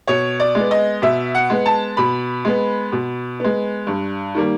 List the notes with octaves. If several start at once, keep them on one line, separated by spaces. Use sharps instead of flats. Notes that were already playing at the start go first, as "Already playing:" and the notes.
B2 C#5
D5
G#3 B3
D#5
B2 E5
F#5
G#3 B3
A5
B2 B5
G#3 B3
B2
G#3 B3
G2
D#3 G3 A#3